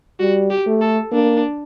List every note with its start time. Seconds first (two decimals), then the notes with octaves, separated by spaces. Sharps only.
0.20 G3 F#4
0.50 G4
0.67 A3
0.81 A4
1.12 A#3 D4